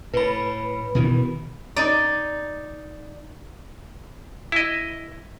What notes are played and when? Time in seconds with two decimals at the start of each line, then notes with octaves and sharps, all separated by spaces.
0.14 A2 B4 B5
0.95 B2 D#3 E3
1.76 D#4 D5
4.52 E4 D#5